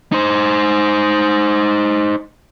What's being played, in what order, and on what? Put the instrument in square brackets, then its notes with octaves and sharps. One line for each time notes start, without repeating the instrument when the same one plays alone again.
[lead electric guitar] D#4 C5